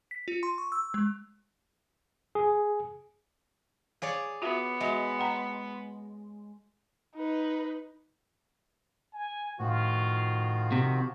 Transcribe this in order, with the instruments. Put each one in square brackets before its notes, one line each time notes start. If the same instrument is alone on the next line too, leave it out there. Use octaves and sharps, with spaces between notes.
[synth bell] B6
F4
C6
C#6
E6
G#3
[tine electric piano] G#4
[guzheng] G#4 C#5 D5 [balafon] F5
[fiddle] B3 [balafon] F4 F#4 E5
[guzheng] G#3 [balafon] F#4 D#5 E5
[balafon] F#5 G5 A#5
[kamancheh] D#4 B4
[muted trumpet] G#5
[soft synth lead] A2 [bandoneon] D#3 F3 F#4 [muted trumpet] F4
[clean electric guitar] C3